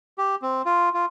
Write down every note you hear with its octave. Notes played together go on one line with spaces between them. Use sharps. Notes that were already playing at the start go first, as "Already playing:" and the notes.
G4
C4
F4
F4